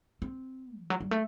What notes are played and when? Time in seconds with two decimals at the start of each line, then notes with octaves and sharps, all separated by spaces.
0.22 C4
0.80 E3
0.90 F#3
1.00 G3
1.11 A3